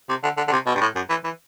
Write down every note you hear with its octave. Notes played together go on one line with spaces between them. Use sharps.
C3
D3
D3
D3
C3
B2
G2
A2
F#2
E3
E3